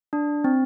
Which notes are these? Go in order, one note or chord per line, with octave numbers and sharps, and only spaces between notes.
D4
C4